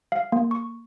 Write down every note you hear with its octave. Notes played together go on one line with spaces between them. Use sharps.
F5
A#3
C#6